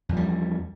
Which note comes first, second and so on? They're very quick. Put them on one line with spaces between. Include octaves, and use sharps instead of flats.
E2 F3 G3